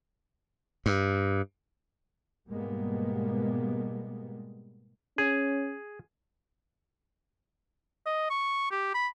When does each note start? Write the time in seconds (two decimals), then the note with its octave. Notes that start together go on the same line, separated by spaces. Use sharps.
0.86 G2
2.48 G#2 B2 G3 G#3 A#3 B3
5.18 C#4 G#4
8.06 D#5
8.30 C#6
8.71 G4
8.94 B5